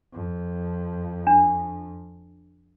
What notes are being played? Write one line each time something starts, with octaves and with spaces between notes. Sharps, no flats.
F2
D4